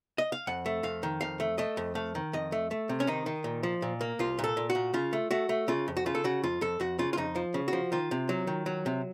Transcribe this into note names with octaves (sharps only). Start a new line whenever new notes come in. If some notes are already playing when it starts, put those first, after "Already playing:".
D#5
F5
F2 F#5
A3
F2 F5
D#3
F2 F5
A3
A3 D#5
F2
A3 F5
D#3
F2 D#5
A3
A3
C3
C#4
D#3 D#4
D#3
A#2
F3
A#2
A#3
C2 F4
A#2
A4
A#2
F#4
A#2
C#3 F4
A3
A3 F#4
A3
C#3 F4
F2
F#4
C#3 F4
A4
C#3 F#4
F2 F4
F2 A4
F2 F#4
C#3 F4
F4
F2 D#4
F3
C#3
F#4
F3
D#3 F4
C3
F#3
D#3
F#3
C3